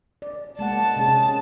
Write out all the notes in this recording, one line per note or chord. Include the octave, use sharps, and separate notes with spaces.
D5
G#3 A#3 F#5 A5
C3 C#4 G#4